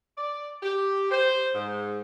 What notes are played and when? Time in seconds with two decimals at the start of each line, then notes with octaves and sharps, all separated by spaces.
0.17 D5
0.63 G4
1.11 C5
1.54 G#2